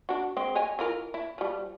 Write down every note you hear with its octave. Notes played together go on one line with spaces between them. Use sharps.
D4 F#4
G#3 C4
C#5 D#5 G#5
E3 F4 A#4
E4
F3 G3